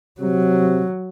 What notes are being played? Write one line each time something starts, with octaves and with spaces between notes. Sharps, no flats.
C3 F#3